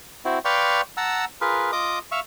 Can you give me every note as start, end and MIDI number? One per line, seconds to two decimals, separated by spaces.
0.25 0.39 60
0.25 0.39 64
0.25 0.39 66
0.45 0.81 71
0.45 0.81 74
0.45 0.81 77
0.45 0.81 79
0.45 0.81 84
0.45 0.81 85
0.97 1.25 78
0.97 1.25 81
0.97 1.25 82
0.97 1.25 88
1.41 1.71 65
1.41 1.71 68
1.41 1.71 70
1.41 1.71 71
1.72 1.99 65
1.72 1.99 75
1.72 1.99 86
1.72 1.99 87
2.12 2.20 76
2.12 2.20 77
2.12 2.20 85